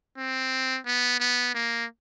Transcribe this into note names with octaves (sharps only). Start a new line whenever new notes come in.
C4
B3
B3
A#3